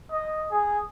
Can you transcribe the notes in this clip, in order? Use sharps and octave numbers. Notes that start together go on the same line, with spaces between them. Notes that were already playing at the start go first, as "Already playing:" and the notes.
D#5
G#4